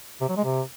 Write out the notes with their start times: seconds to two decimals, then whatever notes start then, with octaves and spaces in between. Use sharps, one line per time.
0.21 C3
0.29 F#3
0.37 G#3
0.45 C3